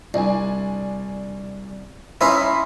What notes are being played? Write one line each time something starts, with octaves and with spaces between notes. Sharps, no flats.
C2 D4 G#5
C#4 D#4 E4 C#5 E5 B5 C6